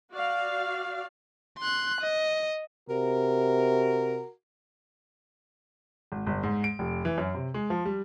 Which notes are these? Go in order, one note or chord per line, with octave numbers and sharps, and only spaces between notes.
F#4 D5 F5
C6 F#6
D#5
C3 F#4 A#4
G#1
G1
G#2
D7
F1
E3
F#2
C3
G#3
F3
G3